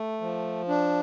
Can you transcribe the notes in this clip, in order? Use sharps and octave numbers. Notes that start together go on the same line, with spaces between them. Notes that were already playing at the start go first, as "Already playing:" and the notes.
Already playing: A3
F3
D4